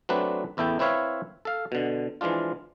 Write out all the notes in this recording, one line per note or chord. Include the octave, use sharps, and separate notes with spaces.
F#3 A3 C4 D4 B4 D5
A1 E2 E4 A4 G5
C4 E4 B4 C#5 E5 F5
A4 F5
B2 D3
E3 F3 G#3 D4 F4